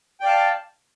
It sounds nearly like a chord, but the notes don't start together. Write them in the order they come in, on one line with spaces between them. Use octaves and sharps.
G5 D5 F5 A5